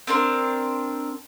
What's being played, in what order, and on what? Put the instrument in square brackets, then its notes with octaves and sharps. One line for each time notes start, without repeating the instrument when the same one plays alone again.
[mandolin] C4 D4 A#4 C6